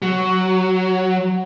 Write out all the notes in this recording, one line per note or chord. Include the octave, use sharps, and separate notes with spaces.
F#3